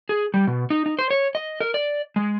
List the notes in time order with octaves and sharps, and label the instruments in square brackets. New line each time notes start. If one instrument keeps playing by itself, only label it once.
[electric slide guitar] G#4
G3
B2
D#4
D#4
C5
C#5
D#5
A#4
D5
G#3